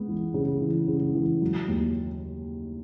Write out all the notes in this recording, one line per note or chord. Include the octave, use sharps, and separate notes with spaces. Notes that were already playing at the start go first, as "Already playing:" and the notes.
Already playing: C#2 B3
E3
C#3
E3
C#3
E3
F#3
D#2